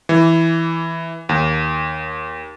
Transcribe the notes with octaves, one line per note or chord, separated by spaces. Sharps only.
E3
D#2